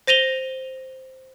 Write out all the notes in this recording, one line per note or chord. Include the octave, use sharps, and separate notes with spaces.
C5 A#6 D#7 F7 G7